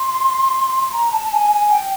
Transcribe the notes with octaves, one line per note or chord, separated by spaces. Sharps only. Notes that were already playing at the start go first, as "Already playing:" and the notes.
Already playing: C6
A#5
A5
A5
G#5
G#5
G5